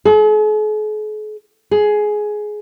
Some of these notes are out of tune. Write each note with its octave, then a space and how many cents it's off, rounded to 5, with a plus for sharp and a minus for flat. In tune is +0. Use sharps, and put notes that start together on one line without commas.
G#4 +45
G#4 +15